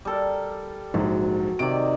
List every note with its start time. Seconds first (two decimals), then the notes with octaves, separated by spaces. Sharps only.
0.05 G3 A4 A#4
0.94 A#1 G#2 F#3
1.59 C3 D#3 D5 D7